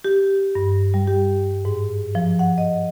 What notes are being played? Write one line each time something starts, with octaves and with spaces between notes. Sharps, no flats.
G4
G2
G3
G4
G#2
F3
F#5
D#5